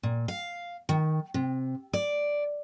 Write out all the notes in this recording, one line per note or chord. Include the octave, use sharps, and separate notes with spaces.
A#2
F5
D#3
C3
D5